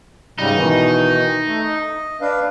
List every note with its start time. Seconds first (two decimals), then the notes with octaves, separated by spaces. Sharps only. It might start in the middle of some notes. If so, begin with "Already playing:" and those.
0.38 G#2 C#3 G3 D#4
0.53 B2 D#3 E3
1.46 A3
1.64 D#5
2.21 D4 B4 F5